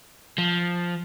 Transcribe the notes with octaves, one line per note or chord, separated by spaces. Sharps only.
F3